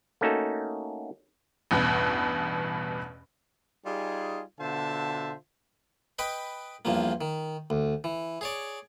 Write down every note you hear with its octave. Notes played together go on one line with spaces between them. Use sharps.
A3 A#3 C#4 D#4 F#4 A4
A1 E2 G2 B2
G3 D#4 F4 G#4
B2 D3 F4 C5 E5 A5
B4 D#5 G5 B5
E2 G2 F3 A#3
D#3
D2
E3
G#4 C#5 D5